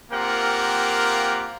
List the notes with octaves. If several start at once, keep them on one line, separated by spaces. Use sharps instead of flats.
A#3 C4 F4 G4 A#4 F#5